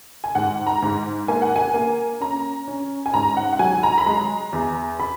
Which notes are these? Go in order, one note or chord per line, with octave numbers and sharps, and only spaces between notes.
G#5
G#2 F#5
A#5
G#2
A#3 G#5
F#5
G#5
A#3
C#4 A#5
C#4
G#5
G#2 A#5
F#5
F#5
F#3 G#5
A#5
B5
G#3 A#5
E2
B5